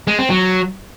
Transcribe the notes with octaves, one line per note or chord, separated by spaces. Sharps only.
G#3
C4
F#3